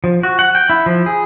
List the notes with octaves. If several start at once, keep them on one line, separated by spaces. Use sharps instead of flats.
F3
F#4
F#5
G5
E4
F3
G#4